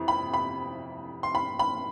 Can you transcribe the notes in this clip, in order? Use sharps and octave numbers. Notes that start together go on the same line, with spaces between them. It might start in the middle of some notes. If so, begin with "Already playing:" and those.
Already playing: F2 C3 E3
B5
B5
C6
B5
B5